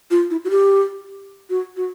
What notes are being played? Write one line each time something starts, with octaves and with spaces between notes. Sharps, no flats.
F4
E4
F#4
G4
F#4
F#4